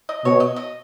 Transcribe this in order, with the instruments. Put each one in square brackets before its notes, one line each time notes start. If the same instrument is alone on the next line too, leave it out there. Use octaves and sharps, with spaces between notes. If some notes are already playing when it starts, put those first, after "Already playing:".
[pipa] D#5
[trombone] B2 [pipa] C#5
[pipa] D#5
D#5